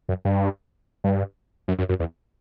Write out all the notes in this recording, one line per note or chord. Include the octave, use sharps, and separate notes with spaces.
F#2
G2
G2
F#2
F#2
F#2
E2